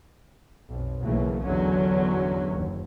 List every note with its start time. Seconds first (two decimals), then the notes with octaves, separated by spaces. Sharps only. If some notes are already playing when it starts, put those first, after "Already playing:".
0.69 B1 F2
1.02 B1 C#3 E3 F#3 A3 A#3
1.43 G1 E2 D3 F#3 C#4
2.48 F#1 D#2